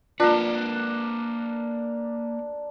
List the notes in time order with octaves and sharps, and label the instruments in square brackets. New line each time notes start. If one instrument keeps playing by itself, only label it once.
[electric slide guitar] A#3 B4 [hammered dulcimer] D4 A#4 [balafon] F4